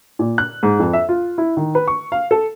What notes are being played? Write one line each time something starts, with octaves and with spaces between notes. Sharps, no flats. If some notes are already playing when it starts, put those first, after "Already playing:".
A#2
F#6
G#2
F2
E5
F4
E4
D#3
B4
C#6
F5
A4